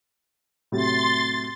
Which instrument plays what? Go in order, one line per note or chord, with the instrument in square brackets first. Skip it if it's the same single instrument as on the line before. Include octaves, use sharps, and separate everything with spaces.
[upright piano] A2 C3 F#3 [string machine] C6 A6